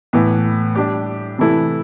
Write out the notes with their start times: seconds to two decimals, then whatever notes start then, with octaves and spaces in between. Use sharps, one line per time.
0.13 A2 E3 B3
0.75 G3 D4 G4
1.38 C3 E3 A3 E4 A4